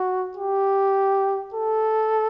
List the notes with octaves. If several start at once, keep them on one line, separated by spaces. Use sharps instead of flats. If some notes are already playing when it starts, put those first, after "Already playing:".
Already playing: F#4
G4
A4